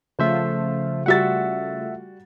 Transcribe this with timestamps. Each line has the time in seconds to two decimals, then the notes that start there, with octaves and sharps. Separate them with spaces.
0.19 C#3 F3 A3 F4 C5 E5
1.06 G3 F#4 E5 F#5 A6